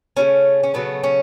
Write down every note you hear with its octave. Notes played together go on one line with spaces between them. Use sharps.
C#3 F#3 A3 C#4
C#4
C#3 F#3 A3 B3
C#4